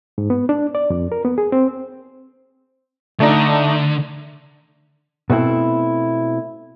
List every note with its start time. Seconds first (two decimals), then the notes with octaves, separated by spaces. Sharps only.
0.18 G#2
0.30 B3
0.49 D4
0.75 D5
0.90 F2
1.12 A#4
1.25 B3
1.38 G#4
1.52 C4
3.20 D3 A3 D4 D#4
5.30 B2 A3 C4 E4